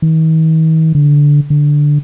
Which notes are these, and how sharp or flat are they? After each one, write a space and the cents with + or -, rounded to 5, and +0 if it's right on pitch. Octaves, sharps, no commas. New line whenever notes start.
D#3 +45
D3 -10
D3 +0